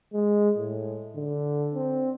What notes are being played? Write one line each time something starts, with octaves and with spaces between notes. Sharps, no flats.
G#3
A2
D3
C4